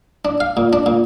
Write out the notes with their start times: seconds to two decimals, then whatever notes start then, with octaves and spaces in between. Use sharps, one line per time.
0.25 D4
0.40 F5
0.57 A#2
0.73 D4
0.86 A#2